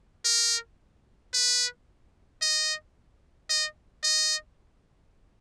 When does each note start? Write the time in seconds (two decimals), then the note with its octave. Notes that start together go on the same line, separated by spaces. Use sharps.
0.25 A#4
1.34 B4
2.42 D#5
3.49 D#5
4.03 D#5